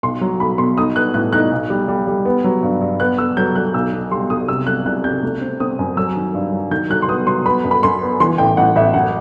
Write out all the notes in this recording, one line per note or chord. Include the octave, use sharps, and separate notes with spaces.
B1 C6
F#3
B1 B5
B2 C6
D#4 D#6
B3 F#6
A2 F#6
D#4 F#6
B1
G3
G3
G3
B3
F#3
G2
G2
B3 F#6
B3 E6
F#3 G6
F#3 F#6
B1 E6
B2
G3 C6
B1 D#6
C3 E6
F#3 F#6
C2 F#6
C3 G6
A3
C4
C4 D#6
F#2
F#3 E6
D#3
G2
F#3
D#3 G6
F#3 F#6
C6
B3 D#6
F#3 C6
B3 B5
F#2
B5
F#2 C6
B3
E3 C6
A1 G5
A1 F#5
A1 E5
F#2 F#5